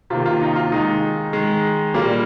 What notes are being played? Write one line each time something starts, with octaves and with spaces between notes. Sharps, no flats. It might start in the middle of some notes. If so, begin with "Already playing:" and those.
C3 D#3 A#3 F4
F4
D#4
F4
D#3 G#3 D#4
D#3 G#3
A#2 G3 A#3